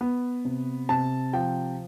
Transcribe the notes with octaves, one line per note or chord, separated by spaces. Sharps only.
B3
C3
C3 A5
F3 G5